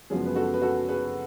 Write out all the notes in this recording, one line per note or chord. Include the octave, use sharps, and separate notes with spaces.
F#2 C#3 F3 G#3 B3 G#4
B4
F#4 A4
B4
F#4 A4
G#4 B4